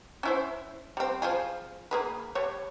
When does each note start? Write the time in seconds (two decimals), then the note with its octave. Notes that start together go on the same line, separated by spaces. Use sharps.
0.23 C#4 E4 C5
0.97 G3 C4
1.22 F3 F4 G#4
1.91 A#3 G#4 B4
2.35 G3 C#5